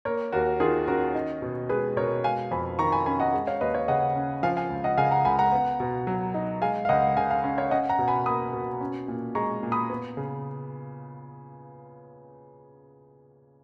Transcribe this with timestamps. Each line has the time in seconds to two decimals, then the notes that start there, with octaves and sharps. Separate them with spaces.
0.05 A#3 A#4 C#5
0.32 D#2 F#4 A#4
0.60 D#3 F4 G#4
0.88 C#4 F#4 A#4
1.15 D#4
1.42 B2
1.69 G#3 G#4 B4
1.97 B2 A#4 C#5
2.24 G#3 F5 G#5
2.51 F2 G#5 B5
2.79 D#3 A#5 C#6
2.92 G#5 B5
3.06 C#4 G#5 B5
3.20 D#5 F#5
3.34 G#3
3.47 C#5 F5
3.61 D#2 B4 D#5
3.74 C#5 F5
3.88 C#3 D#5 F#5
4.15 C#4
4.43 F3 F5 G#5
4.57 F5 G#5
4.70 C#2
4.84 D#5 F#5
4.97 C#3 F5 G#5
5.11 F#5 A#5
5.25 C#2 G#5 B5
5.39 F#5 A#5
5.52 B3
5.80 B2
6.07 F#3
6.34 D#4
6.62 G#3 F5 G#5
6.85 F5
6.89 C#2 D#5 F#5
7.17 C#3 F5 G#5
7.31 F5 G#5
7.44 C#4
7.58 C#5 F5
7.71 C#4 D#5 F#5
7.89 F#5 A#5
7.99 B2
8.08 G#5 B5
8.26 A#3 B5 D#6
8.53 B2
8.81 C#4
9.08 A#2
9.35 G#3 A#5 C#6
9.63 A#2
9.72 B5 D#6
9.90 B3
10.17 C#3